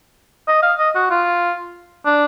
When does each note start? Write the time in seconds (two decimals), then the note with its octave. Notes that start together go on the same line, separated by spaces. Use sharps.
0.48 D#5
0.62 F5
0.79 D#5
0.95 F#4
1.10 F4
2.06 D4